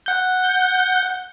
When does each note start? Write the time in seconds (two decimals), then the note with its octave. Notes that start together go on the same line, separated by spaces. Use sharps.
0.06 F#5 G6